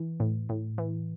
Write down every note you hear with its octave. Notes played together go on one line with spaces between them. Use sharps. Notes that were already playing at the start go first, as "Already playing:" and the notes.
Already playing: E3
A2
A2
E3